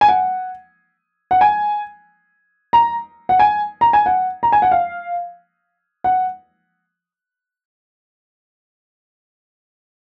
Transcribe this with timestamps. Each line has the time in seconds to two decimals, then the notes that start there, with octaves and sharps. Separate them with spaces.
0.01 G#5
0.08 F#5
1.31 F#5
1.41 G#5
2.73 A#5
3.29 F#5
3.39 G#5
3.81 A#5
3.93 G#5
4.06 F#5
4.43 A#5
4.52 G#5
4.62 F#5
4.72 F5
6.04 F#5